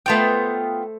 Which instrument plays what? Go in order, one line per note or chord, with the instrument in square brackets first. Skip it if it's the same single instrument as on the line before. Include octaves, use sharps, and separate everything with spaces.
[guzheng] A3 C5 C#5 [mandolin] B3 F4 G5